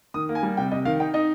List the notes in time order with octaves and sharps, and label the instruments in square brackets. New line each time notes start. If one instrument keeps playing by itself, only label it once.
[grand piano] D#3 D#6
A#3
G#5
G3
C3 G5
C3 D#5
D#3 F5
D#4 G5
D#4 D#5